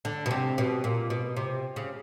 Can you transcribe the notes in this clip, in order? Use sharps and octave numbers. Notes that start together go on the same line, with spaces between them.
D3
B2
C3
B2
A#2
B2
C3
C#3